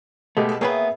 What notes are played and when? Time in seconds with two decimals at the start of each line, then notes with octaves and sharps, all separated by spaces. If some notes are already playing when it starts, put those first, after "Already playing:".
0.37 B2 G#3 A3 G4
0.49 A4 D5
0.61 A#3 B3 G#4 B4 C#5 E5 G5